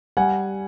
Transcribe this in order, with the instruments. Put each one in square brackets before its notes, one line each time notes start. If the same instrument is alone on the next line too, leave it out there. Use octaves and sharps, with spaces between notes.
[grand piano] G3 F#5 G#5